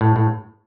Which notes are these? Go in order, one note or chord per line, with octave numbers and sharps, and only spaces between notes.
A2
A2